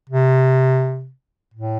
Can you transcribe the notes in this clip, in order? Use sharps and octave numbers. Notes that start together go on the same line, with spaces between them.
C3
A2